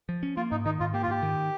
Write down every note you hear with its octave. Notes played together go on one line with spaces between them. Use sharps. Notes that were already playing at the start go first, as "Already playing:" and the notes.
F3
C#4
A#3 F4
G#2 D#4
D#3 D#4
G#2 F4
A#3 G4
F4
G#2 G4
D#3